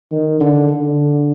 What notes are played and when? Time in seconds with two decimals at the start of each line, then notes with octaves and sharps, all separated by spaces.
0.12 D#3
0.40 D3
0.69 D3